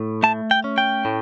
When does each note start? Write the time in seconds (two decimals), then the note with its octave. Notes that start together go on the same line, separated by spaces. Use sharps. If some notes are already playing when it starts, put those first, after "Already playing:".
Already playing: A2
0.23 A3 A5
0.51 G5
0.64 C#4
0.78 G5
1.05 A2